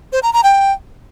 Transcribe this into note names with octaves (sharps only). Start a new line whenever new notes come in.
C5
A#5
A#5
G5